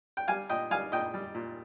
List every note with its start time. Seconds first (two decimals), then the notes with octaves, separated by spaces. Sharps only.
0.17 G5
0.28 G3 F5 G#5
0.50 A#2 D#5 G5
0.71 G3 F5 G#5
0.92 A#2 D#5 G5
1.14 G3
1.35 A#2